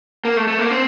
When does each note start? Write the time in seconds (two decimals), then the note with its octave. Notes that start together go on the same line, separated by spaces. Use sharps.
0.25 A#3
0.37 A3
0.48 A3
0.59 A#3
0.70 C4